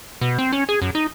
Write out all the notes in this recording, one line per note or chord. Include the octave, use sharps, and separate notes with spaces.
B2
C4
C#4
G#4
F#2
D#4